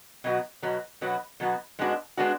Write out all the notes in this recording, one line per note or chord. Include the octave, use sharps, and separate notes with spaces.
B2 F#3 B3 F#4
B2 F#3 B3 F#4
B2 F#3 B3 F#4
B2 F#3 B3 F#4
G#2 G#3 B3 D4 F#4
G#3 B3 D4 F#4